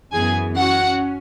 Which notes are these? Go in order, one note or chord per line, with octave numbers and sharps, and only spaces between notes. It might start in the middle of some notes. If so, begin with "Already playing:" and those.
F#2 E3 B3 G#4 G#5
C#4 F#4 F#5